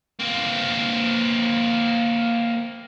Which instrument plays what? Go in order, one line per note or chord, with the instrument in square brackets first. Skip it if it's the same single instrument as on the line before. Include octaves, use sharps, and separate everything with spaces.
[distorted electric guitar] A#3 C4